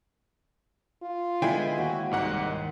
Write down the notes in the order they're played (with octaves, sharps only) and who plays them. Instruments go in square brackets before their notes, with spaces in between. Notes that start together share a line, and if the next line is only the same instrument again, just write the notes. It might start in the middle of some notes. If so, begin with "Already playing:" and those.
[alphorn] F4
[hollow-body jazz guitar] D3 G#3 B3 [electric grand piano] E4 G5 G#5
[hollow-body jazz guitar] D#2 [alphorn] F#4
[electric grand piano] C2 G#2 F#5 [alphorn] D#3